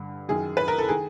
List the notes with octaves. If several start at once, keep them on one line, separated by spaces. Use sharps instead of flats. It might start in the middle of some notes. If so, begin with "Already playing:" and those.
Already playing: G2 D3
F#2 D#3 G#4
B4
A#4
A4
D#3 G#4